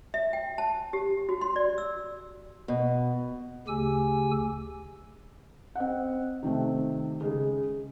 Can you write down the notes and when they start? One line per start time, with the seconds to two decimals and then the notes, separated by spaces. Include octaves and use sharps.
0.14 E5
0.33 G5
0.58 A5
0.93 G4
1.29 F#4
1.41 C6
1.56 D5
1.78 E6
2.68 B2
3.67 D2 C#3 G4 G#5 E6
5.75 C4 D#5 F#5
6.43 C3 D#3 A3 C4
7.21 C#3 G#3